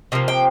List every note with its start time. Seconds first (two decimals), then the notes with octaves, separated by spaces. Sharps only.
0.12 C3 F3 A#3
0.28 G5